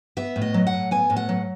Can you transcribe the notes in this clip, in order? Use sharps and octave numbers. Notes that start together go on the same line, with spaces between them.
B3 E5
A2
D#5
F#3
F#5
A2
B3 G#5
A2
F#5
F#3